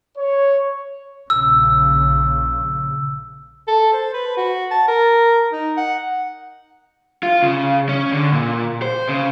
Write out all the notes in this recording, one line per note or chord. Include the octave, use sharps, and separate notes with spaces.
C#5
A#1 C#3 E6
A4
C5
B4
F#4
A5
A#4
D#4
F#5
F4
C#3
C#4
D3
A#2
C5
C#3